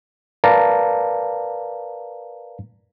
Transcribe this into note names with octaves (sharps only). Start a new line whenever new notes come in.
A#4 B4 D5 F5 A5 A#5